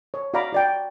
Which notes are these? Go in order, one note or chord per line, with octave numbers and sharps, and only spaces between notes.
C#5
F#4 D5 F5 A#5 B5 D6
F#4 D5 G5